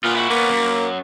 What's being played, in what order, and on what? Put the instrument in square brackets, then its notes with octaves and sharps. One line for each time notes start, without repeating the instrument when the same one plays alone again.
[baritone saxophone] A#2 [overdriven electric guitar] B3 F4
[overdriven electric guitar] E4 F#4
[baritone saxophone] A#3 [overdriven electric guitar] B3 C#4
[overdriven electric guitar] F#2